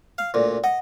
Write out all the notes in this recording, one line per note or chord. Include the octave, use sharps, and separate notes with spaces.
F5
D2 A#2
D#5 F#5